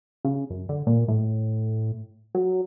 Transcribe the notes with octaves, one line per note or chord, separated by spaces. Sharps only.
C#3
F#2
D3
A#2
A2
F#3